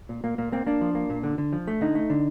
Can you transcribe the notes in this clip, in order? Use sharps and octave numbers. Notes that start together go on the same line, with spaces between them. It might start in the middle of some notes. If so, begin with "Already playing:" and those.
A#2
A#2 A#3
A#2 A#3
A#3 C4
A#3 D4
F3
A#3
A#2
D3
D3
F3
A3
D3 D#4
A3
D3